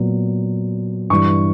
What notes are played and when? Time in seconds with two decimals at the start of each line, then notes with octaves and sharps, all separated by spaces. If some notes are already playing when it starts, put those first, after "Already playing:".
Already playing: A#2 F#3 B3
1.10 G2 E3 G3 C#6